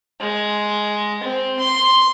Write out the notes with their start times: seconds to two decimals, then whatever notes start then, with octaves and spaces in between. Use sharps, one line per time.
0.20 G#3
1.23 C4
1.60 C6